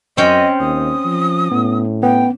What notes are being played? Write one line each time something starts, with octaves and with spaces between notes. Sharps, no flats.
F#2 C4 C#4 D#5 G5
D#2 D#6
F3
A2 B3
B3 G5